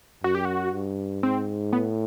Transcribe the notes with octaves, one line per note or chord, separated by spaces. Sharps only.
F#2 F#4
G4
F#4
G2
G#2 C4
A2 B3